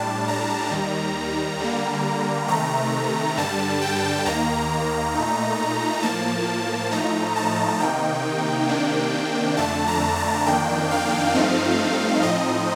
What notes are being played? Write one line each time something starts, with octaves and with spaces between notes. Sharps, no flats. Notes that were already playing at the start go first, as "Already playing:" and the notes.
Already playing: A2 G3 D4 A5
A#5
D#2 D#3 G3
D3 G3 A#3
C3 D#3 A3 A#5
G2 D3 G3 A5
G5
D#2 D#3 A#3 A#5
A#2 A3 D#4
A2 F3 A#3 A5
A2 F3 A3 D#4 A#5
A5
C3 D#3 A#3 D#4 G5
C3 D#3 A#3 D4
F2 D3 A3 D4 A5
A#5
A5
F2 D#3 A#3 D4 G5
F5
G2 F3 A3 C4 D#4
A2 F3 C4 D#4 D#5